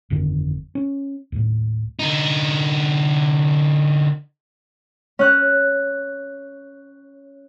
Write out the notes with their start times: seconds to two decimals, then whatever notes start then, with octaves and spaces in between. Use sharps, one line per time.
0.10 G1 F2 D3 D#3
0.75 C#4
1.32 D#2 A2
1.99 D3 D#4
5.19 C#4 F#6